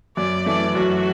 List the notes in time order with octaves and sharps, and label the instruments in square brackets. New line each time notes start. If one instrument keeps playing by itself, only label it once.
[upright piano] F#2 [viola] D5
[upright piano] E3 A3 [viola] D5
[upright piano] F#2 [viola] F#4